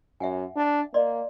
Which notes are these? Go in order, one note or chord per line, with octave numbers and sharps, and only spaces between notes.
F#2 E5 F#5 G#5
D4
A#3 D5 D#5 C6